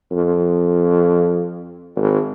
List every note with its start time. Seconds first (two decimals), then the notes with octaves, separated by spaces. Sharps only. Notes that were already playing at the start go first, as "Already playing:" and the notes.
0.11 F2
1.96 G#1